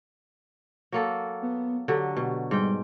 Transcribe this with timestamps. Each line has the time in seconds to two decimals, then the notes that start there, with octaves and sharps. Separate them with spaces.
0.92 F#3 A#3 A4
1.42 B3
1.88 D3 F#3 G4
2.17 B2
2.51 G#2 G3 G5